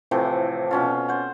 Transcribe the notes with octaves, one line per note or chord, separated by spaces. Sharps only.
A2 C3 E3 F3
B2 C#4 F4
C5 F#5